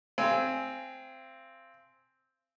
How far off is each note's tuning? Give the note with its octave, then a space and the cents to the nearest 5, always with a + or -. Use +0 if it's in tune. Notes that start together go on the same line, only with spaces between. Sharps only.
C4 +0 F5 -35 G#5 +10